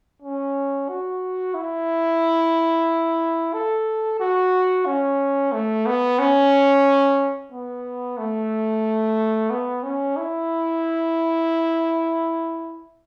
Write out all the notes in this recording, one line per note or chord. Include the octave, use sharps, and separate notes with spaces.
C#4
F#4
E4
A4
F#4
C#4
A3
B3
C#4
B3
A3
B3
C#4
E4